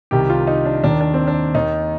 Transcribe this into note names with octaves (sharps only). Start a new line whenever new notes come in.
C2 C3 D#3 G4
F4
D#4
D4
D#2 D#3 D4
D4
C4
D4
D#2 D#3 D#4